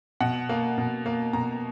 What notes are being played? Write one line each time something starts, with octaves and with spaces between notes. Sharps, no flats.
B2 F#5
A#3
B2
A#3
B2 A#5